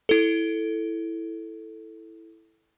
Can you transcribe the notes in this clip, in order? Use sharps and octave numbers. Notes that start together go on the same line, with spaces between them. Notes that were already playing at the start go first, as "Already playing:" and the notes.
E4 A4